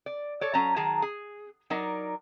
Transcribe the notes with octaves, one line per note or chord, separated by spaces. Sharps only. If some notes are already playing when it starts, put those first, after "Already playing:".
D5
A4 C#5 D5
F#3 C#4 A5 A#5
D#3 F#3 G#4 A5 A#5
G#4
F#3 D#4 A#4 D5